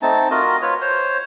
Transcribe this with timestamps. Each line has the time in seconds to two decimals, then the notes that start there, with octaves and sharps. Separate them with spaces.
0.02 A3 C4 D#4 A5
0.31 F4 F#4 A#4 D#5
0.62 F4 B4 C#5
0.81 C5 C#5